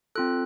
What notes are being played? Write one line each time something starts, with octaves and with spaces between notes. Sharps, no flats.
C4 F4 A4 F#6